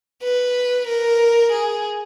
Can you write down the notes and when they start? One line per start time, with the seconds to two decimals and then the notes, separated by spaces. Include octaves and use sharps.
0.24 B4
0.87 A#4
1.52 G#4